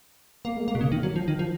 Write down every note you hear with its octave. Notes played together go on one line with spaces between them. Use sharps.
A#3
G#3
A#3
B2
C#3
D#3
F#3
F3
D#3
F3